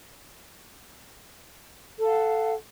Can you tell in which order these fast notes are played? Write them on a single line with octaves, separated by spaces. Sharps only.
A4 F5 F#5